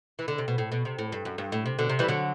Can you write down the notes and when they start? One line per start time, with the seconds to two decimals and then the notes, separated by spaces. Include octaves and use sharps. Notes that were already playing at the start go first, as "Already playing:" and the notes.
0.19 E3
0.28 D3
0.38 C3
0.48 B2
0.58 A2
0.72 B2
0.85 C3
0.99 A2
1.12 G2
1.25 F#2
1.38 G2
1.52 A2
1.66 C3
1.79 B2 D3
1.89 C3
1.99 E3 G3
2.08 D3 F#3